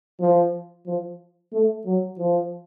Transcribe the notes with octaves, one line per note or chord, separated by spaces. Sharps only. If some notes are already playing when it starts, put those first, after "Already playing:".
F3
F3
A3
F#3
F3